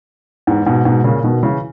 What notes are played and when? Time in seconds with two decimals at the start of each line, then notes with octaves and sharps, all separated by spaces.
0.47 E2 G#2
0.66 G#2 B2
0.85 G#2 B2
1.04 A#2 C#3
1.23 B2 D#3
1.43 C#3 E3